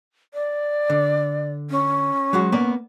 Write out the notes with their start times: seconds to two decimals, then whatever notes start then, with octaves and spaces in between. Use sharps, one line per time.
0.34 D5
0.90 D3
1.70 C#4
2.33 F#3 G#3 F#4
2.52 A#3 B3 D5